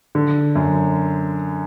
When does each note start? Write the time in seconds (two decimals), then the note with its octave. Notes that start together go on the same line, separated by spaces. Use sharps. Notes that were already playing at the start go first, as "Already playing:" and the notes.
0.15 D3
0.55 F#2